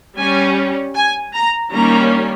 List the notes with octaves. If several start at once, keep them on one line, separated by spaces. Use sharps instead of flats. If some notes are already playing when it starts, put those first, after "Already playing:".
G3 C#4 G#5
G#5
A#5
D#3 G3 A#3 C#4 A#5